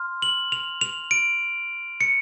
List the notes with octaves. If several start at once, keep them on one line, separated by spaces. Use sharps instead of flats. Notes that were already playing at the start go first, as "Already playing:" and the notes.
Already playing: C6 F6
F#7
F7
F7
D7
C#7